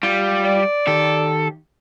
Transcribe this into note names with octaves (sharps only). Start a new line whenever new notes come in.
G3 F4
D5
D#3 G4 A4